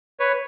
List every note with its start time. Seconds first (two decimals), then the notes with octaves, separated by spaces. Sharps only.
0.20 B4 C#5